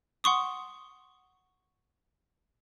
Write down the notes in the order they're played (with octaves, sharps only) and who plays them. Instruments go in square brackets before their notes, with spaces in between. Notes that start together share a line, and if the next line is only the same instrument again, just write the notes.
[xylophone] F#5 C6 C#6 D#6